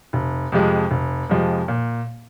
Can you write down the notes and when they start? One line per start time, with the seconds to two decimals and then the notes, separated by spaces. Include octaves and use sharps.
0.13 F1
0.52 F2 C3 F3 G#3
0.91 F1
1.29 F2 C3 F3 G#3
1.68 A#2